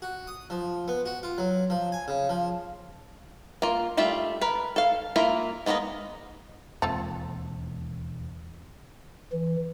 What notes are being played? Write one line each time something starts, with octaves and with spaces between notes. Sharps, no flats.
F#4
D#6
F3
B3
F#4
F4
F#3
F3
G#5
C#3
F3
A#3 F4
G3 A3 F4 E5
A#4 B4
A4 F5
A#3 E4 F4 A#4 E5
G#3 A#3 B3 F4 D#5
E1 D#2 G#3 C4 F4 A4
E3